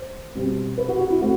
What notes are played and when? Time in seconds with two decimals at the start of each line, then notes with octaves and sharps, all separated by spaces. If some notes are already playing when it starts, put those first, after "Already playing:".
Already playing: C5
0.35 B2 G3 C4
0.77 B4
0.88 F#4
0.99 F#4
1.10 E4
1.21 A3 C4 F#4